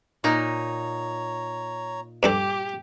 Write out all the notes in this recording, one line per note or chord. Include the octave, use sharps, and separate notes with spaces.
A#2 D#4 C#5 A#5
G2 D4 G4 A4 D6